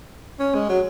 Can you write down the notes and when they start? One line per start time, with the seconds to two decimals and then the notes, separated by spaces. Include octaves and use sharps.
0.39 C#4
0.54 G#3
0.69 F#3